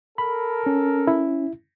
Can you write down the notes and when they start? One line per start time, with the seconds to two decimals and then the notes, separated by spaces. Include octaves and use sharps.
0.18 A4 A#4 B5
0.66 C#4
1.07 E4